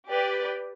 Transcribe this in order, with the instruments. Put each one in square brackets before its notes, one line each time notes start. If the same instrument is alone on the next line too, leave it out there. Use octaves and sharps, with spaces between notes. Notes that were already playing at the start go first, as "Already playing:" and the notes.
[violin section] G4 B4 D5